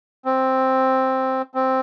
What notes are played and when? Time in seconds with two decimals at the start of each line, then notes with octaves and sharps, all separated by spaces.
0.25 C4
1.54 C4